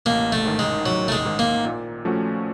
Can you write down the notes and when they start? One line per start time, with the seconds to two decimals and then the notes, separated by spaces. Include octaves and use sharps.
0.06 A1 A#3
0.32 A3
0.45 G#2 D#3
0.59 G#3
0.85 A1 F#3
1.08 A3
1.12 G#3
1.25 G#2 D#3
1.39 A#3
1.65 A#2
2.05 F3 A3 C#4 F#4